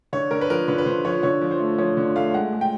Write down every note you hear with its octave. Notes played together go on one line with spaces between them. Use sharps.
D3 C#5
D3 A#4
B4
F3 A#4
D3 B4
B4
D3 C5
F3 C#5
D3 C#5
F3
C5
A3
F3 C#5
D3
A3 F5
G#3 F#5
G#3
G5